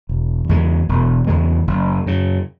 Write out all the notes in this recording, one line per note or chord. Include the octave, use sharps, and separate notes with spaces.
E1
E2 C#3 G#3
E1
E2 C#3 G#3
F#1
F#2 C#3